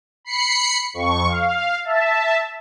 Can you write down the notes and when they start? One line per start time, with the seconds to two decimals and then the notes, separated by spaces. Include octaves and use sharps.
0.25 B5 C7 C#7
0.94 F2 C#6
1.29 F5
1.85 E5 A5